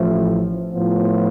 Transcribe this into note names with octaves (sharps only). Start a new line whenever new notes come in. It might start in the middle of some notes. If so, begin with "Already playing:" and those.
Already playing: A1 A2 F3 A3
A2 F3 B3 F4 C5